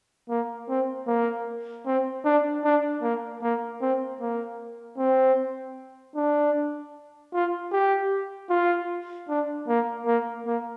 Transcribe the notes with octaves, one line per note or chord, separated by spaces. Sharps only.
A#3
C4
A#3
C4
D4
D4
A#3
A#3
C4
A#3
C4
D4
F4
G4
F4
D4
A#3
A#3
A#3